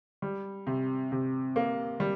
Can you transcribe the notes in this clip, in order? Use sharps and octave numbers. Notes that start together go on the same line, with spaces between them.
G3
C3
C3
A#3
G3